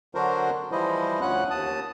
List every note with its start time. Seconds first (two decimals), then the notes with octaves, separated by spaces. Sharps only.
0.15 D3 F#3 D4 F#4 A#4 C5
0.72 E3 F3 G3 E4 C5 D#5
1.22 D2 F3 C#4 F#5 F#6
1.50 D#2 A5 D#6